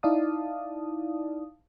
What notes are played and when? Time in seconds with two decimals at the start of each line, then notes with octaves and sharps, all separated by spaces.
0.03 D#4 E4 D5 F5 A5 D#6